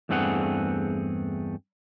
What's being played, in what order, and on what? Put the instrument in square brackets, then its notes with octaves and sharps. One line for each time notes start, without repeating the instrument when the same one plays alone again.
[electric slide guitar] E2 G2 A3 C4 G#4 F#5